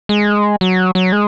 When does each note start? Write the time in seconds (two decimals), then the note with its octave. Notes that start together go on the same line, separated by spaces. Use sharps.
0.09 G#3
0.61 F#3
0.95 F#3
1.12 G#3